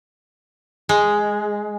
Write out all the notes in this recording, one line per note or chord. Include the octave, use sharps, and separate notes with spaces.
G#3